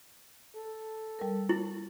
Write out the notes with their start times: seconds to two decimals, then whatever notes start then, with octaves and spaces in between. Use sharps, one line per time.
0.56 A4
1.19 G3 A#4
1.49 E4 A6